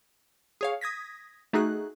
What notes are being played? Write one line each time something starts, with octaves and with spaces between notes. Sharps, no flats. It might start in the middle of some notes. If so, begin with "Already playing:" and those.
G#4 C#5 F5
D#6 G#6 A#6 B6
A3 D#4 F#4 G#4 F#6